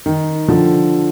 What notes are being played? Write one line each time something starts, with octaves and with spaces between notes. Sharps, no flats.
D#3
D3 F3